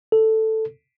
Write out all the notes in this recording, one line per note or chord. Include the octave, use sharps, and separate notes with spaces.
A4